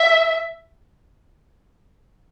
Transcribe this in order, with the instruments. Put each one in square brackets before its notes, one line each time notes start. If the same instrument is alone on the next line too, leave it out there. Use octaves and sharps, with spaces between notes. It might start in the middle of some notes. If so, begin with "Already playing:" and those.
Already playing: [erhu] E5